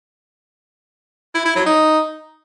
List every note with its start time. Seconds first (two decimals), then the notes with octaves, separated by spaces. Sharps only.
1.35 E4
1.45 E4
1.56 F#3
1.66 D#4